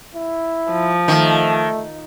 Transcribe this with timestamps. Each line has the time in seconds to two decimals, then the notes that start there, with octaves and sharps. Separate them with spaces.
0.15 E4
0.72 F3
1.08 D#3 A3